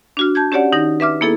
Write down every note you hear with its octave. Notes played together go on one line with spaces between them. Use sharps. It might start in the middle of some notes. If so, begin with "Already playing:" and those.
D4 F#4 F6
A5 G6 G#6
C#4 G4 C#5 D5 F#5
D#3 D#4 A#6
B4 E5 D6 F6
A#3 B3 E4 G#4 A4